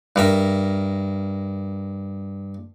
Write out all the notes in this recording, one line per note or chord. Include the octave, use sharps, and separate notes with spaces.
G2 A#4 E5